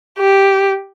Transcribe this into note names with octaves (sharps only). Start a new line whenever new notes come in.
G4